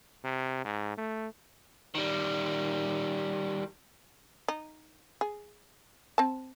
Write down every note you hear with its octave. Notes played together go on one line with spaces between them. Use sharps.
C3
G#2
A3
D#3 G3
D#4
G#4
C4 A5